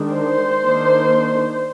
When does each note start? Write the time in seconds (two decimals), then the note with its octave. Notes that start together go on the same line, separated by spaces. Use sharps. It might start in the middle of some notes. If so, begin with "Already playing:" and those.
Already playing: D#3 G#3 D4
0.12 C5
0.61 D#3 A#3 D4